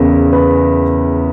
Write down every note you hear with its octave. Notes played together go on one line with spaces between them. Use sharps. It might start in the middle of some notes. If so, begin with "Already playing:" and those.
Already playing: E2 C#3 E3 A#4
B4